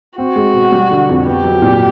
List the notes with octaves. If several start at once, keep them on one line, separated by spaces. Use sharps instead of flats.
C4 F#4
G#3
B2
G3
D3
F2
B3 G4
F#3
A#2